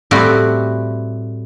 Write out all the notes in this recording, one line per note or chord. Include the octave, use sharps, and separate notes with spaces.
A2 G3 C4 E4 F#4